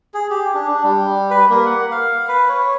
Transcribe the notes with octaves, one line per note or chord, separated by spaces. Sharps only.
G#4
G4
D4
D4
G3
B4
A#3
F#5
F5
B4
C#5